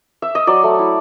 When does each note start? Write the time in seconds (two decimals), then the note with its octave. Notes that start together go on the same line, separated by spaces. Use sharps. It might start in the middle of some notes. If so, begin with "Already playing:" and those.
0.22 E5
0.35 D#5
0.47 F#3 D5
0.64 A3
0.79 E4